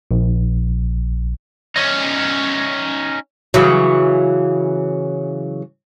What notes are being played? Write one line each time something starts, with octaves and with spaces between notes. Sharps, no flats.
A#1
C#4 D#4
C#3 E3 F#3